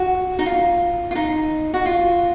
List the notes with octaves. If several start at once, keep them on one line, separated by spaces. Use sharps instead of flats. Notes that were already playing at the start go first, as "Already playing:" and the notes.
Already playing: F#4
D#4
F4
F4
D#4
F#4
F4